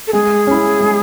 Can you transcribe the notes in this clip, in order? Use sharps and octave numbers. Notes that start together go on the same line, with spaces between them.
A4
G#3 G#4
C#4 E4
G#3